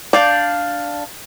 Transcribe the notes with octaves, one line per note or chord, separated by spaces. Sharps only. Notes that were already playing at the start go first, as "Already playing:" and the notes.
D4 D5 F5 G6